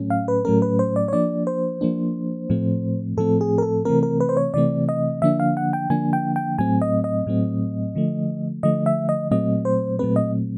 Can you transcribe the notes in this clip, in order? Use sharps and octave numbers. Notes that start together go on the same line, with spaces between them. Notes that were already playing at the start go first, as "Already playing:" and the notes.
Already playing: A2 F#3 A3 C#4
F5
B4
A2 F#3 A3 C#4 A#4
B4
C5
D5
C#5
F3 A#3 D4 D5
C5
F3 A#3 D4
A2 F3 A3 C4
A2 F3 A3 C4 A4
G#4
A#4
A4
C3 E3 A3 C4 A#4
A#4
B4
C5
C#5
C3 E3 A3 C4 D5
D#5
D3 F3 A#3 D4 E5
F5
F#5
G5
D3 F3 A#3 D4 G#5
G5
G5
A2 F#3 A3 C4 G#5
D#5
D#5
A2 F#3 A3 C4
D3 F3 A3
D3 F3 A3 D#5
E5
D#5
A#2 F#3 A3 C4 D#5
C5
A#2 F#3 A3 C4 B4
D#5